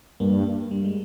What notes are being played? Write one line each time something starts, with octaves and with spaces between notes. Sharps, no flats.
G2 A#3
G3
G#3